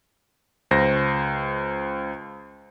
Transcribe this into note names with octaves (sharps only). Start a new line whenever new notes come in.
C#2 C5 A#6